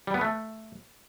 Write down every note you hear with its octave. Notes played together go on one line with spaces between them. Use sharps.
G3
B3
A3